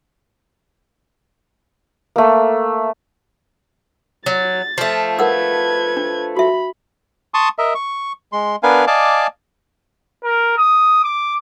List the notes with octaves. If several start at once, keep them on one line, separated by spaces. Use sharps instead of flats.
A3 A#3
F#3 A6
F3 A3
A#4 B4 F#5 E6 G#6
D4
F#4 E5 B5
A5 C6 C#6 D#6
A#4 D#5 E5
C#6
G#3 C6
B3 D4 A#4 B4 F5 G#5
D5 D#5 F5 G#5 A5 D6
A#4
D#6
D6